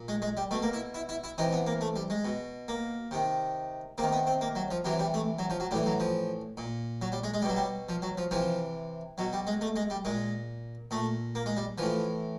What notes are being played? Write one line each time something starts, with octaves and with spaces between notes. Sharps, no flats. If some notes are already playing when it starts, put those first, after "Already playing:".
Already playing: A#2
G#3
G#3
G3
B2 A3
A#3
E4
E4
E4
E4
C3 E3 D#4
B3
A#3
A3
G3
G#3
B2
A#3
C3 D#3
C3 D#3 A#3
B3
C4
A#3
F#3
F3
C3 E3 F#3
G3
A3
F#3
F3
F#3
A2 E3 G3
F#3
F3
A#2
F#3
G3
G#3
G#3
G3
B2 F#3
G3
F3
F#3
F3
C3 E3 F3
B2 F#3
G3
G#3
A3
G#3
G3
A#2 G#3
A#2 A3
A#3
G#3
G3
A2 E3 F3